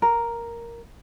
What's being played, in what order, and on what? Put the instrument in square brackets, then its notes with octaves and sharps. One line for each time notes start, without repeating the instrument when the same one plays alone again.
[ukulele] A#4